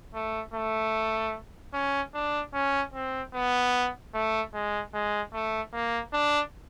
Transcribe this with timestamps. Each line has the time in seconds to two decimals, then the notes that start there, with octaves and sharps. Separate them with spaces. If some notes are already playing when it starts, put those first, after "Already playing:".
0.14 A3
0.53 A3
1.73 C#4
2.14 D4
2.54 C#4
2.94 C4
3.33 B3
4.14 A3
4.53 G#3
4.93 G#3
5.33 A3
5.73 A#3
6.13 D4